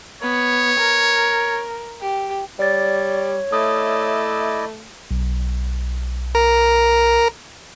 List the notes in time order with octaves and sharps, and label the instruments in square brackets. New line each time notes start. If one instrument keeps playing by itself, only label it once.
[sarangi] B3 [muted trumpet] C#5
[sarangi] A#4
G4
[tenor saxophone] G3 [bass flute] C#5 [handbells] D5 A6
[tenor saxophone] A3 [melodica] E4 D5 D#5 [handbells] D#6
[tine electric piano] B1
[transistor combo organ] A#4